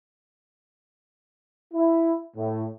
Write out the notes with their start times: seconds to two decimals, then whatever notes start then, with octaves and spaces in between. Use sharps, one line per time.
1.74 E4
2.36 A2